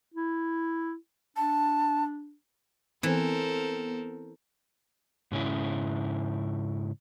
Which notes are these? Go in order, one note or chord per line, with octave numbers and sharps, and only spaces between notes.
E4
D4 A5
E3 B3 C4 A4 A#4 C5
G#2 C#3 C#4 E4